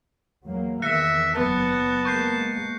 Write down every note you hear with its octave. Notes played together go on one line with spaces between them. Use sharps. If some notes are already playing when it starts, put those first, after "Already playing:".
E2 F#3 A#3
E2 D#3 E5 F#6 A#6 C#7
F#1 F#2 F#3 B3 A5
G#3 A#3 C#6 G6 C7